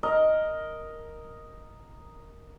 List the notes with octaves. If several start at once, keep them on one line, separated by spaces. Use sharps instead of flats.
A#4 D#5